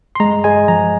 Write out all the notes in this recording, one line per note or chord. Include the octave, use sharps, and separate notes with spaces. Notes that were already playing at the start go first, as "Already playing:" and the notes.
C6
G#3 A#5
G#3 G#5
F3 A#5